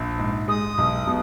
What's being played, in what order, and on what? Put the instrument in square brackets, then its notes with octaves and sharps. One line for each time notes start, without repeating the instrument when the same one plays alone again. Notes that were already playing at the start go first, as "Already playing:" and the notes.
Already playing: [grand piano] A#1
G#2
[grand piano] G#3 [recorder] D#6
[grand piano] B1
B2